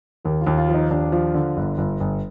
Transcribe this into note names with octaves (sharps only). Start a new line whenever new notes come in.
D#2 A#4
F4
D#2
F4
F3
D#4
D#2 D4
F3
D3
G1
G1
G1